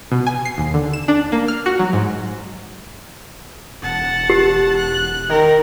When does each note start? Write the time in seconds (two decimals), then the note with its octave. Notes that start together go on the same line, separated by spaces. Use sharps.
0.12 B2
0.27 G#5
0.45 C7
0.58 D#2
0.74 D3
0.93 E7
1.08 D4
1.32 A#3
1.48 F6
1.66 F#4
1.79 F#3
1.93 G#2
3.82 E1 F#5 A5
4.30 G4
4.77 F#6
5.30 D#3 A#4